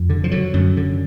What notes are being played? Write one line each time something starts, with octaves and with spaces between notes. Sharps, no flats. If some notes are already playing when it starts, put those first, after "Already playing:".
Already playing: F2
D3
F3
D3 F#3
F#2
D3